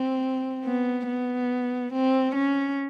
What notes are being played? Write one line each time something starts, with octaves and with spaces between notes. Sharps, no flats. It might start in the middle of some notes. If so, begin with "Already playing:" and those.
Already playing: C4
B3
B3
C4
C#4